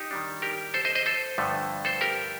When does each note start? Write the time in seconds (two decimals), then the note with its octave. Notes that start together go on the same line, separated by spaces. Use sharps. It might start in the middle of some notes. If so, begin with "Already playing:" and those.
Already playing: D#4 G4
0.11 D#3 G3 D4
0.42 G4 A#4
0.74 A4 C5
0.85 C5 D#5
0.95 C5 D#5
1.06 A4 C5
1.38 G2 D3 F3 A3
1.85 A4 C5
2.01 G4 A#4